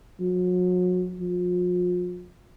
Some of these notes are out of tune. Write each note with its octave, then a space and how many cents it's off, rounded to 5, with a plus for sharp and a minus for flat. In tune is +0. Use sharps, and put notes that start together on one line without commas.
F#3 -35
F3 +40